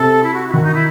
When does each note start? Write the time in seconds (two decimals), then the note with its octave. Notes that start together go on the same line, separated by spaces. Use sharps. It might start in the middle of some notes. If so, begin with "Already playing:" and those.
Already playing: C3 A4
0.23 E4
0.34 F#4
0.48 E4
0.53 D#3 F#4
0.64 D#4
0.74 E4